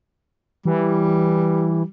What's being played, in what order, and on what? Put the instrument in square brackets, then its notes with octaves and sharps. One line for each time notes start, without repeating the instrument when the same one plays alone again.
[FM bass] E3 [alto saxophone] G3